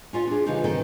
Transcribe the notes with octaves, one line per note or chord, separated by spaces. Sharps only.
C#4 F4 D#5 F#5 G#5
D4 E4 G#4
C#3 E3 F3 G3 D#4
D2 G2 D#3 C4 A4 G5